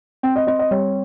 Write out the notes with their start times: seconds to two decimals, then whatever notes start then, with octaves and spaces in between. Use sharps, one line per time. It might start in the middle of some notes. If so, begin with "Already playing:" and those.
0.23 C4 G5
0.36 D#5
0.47 C4 D#5
0.59 D#5
0.71 G3 C#5